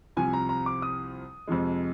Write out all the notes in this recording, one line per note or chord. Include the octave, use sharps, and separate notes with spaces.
C2 C3 F3 G#5
A#5
A#5
D6
D#6
F2 C3 F3 G#3